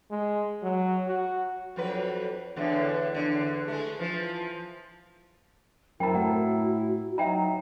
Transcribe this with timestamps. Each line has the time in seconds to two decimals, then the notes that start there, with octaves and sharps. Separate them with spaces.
0.11 G#3
0.63 F#3
1.08 F#4
1.76 F2 F#3 B4
2.56 E2 A2 D3
3.14 E2 G#2 D3
3.68 G#3 A3
3.99 E3 F3
6.00 F#2 C4 E4 A#4 G5 A5 A#5
6.15 A2 F#4 F#5
7.18 F#3 D#4 E5 G5 A#5